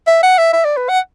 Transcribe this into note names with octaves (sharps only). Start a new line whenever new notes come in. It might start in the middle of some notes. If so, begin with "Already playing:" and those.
E5
F#5
E5
E5
D5
B4
F#5